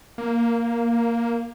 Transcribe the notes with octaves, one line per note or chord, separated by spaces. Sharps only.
A#3